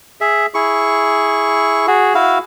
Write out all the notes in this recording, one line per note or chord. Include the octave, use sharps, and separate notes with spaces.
G#4 E5
E4 G#4 C#6
F#4 G#4
E4 F#4 F5